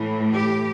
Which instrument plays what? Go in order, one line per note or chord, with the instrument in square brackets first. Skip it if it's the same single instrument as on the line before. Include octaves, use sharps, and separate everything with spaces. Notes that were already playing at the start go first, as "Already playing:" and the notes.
Already playing: [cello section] A2 E3
G4